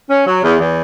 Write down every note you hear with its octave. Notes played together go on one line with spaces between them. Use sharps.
C#4
F#3
E2
E2